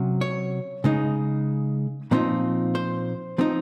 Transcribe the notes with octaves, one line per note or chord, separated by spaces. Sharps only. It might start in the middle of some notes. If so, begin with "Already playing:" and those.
Already playing: C3 F#3 C#4
C#5
C#3 G#3 D#4
A#2 F3 C4 D#4
C5
F3 C4 D#4